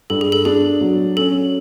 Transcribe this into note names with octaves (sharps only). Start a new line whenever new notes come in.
G2 A4
G#4
A4
D4 G#4
F#3
C#4 A4